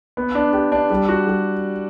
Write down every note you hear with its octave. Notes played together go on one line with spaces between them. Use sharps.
B3
D4
G4
D4
G3
F#4
G3